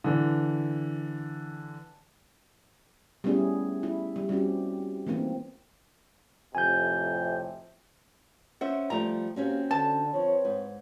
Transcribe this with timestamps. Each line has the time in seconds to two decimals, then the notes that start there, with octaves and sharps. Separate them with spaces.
0.04 D3 E3
3.24 G3 A3 B3 C#4 E4 G#4
3.83 E4
4.16 G3
4.29 G3 C4 C#4 F#4 G4
5.07 E3 A3 A#3 C4 D#4
6.55 F2 A2 C3 G#5 G6
8.61 C#4 C5 E5 F#5
8.90 F3 G3 A3 A#5
9.36 A#3 C4 C#4 F#4 G4
9.71 D3 A5
10.13 F3 C4 B4 C#5
10.45 G#2